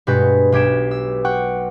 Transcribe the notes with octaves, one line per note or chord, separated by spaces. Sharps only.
G2 B2 G#3 F#4 B4 G6
B1 G4 G#6 D7 E7
E6
F#5 G5 C#6 F#6